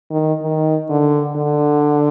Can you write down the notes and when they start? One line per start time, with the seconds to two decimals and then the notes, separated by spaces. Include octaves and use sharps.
0.11 D#3
0.42 D#3
0.90 D3
1.36 D3